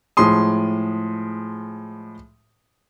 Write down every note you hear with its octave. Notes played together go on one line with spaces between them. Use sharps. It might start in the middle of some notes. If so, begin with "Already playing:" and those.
A2 F3 G#3 C6 D#6